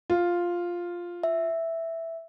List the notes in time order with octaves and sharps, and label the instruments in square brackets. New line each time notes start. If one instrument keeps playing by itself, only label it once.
[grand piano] F4
[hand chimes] E5